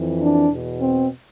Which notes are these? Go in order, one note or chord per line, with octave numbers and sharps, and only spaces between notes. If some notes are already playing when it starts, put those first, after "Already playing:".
Already playing: F2 E3
D4
E2 B2
C4